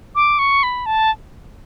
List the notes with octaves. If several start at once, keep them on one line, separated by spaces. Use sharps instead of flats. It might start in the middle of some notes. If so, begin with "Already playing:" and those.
D6
C#6
B5
A5